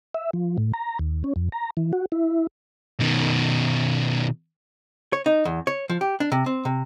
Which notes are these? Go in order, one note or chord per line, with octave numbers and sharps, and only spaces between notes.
E5
F3
A2
A#5
D#2
C#4
F2
A#5
E3
F#4
E4
B2 D#3
C#5
D#4
E2
C#5
F3
G4
D4
C3
C4
C3